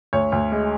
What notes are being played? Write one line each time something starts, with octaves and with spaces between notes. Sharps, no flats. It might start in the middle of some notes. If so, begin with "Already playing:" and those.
D2 C#5
D2
G#3